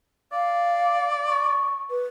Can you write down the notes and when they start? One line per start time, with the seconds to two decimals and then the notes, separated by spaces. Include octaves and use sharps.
0.32 D5 F5
1.27 C#6
1.90 B4